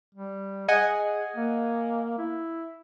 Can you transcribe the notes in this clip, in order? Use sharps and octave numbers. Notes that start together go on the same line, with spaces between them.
G3
G#4 D#5 F#5 G#5
A#3
E4